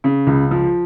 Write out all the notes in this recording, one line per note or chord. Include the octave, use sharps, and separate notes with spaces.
C#3
C#2
F3